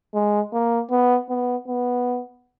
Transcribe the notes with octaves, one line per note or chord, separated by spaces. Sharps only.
G#3
A#3
B3
B3
B3